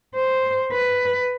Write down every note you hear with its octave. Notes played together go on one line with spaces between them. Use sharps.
C5
B4